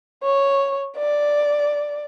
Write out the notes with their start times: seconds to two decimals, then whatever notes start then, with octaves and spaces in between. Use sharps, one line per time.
0.23 C#5
0.97 D5